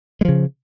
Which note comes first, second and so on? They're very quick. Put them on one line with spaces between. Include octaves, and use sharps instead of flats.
G#3 F3 C#3